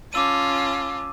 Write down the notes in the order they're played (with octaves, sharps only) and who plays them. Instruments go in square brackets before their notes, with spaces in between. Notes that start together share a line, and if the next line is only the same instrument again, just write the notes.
[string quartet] C#4 F4 A5 [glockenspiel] D6 E6 D#7